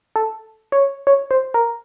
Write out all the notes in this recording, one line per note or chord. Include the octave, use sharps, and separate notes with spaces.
A4
C#5
C#5
C5
A#4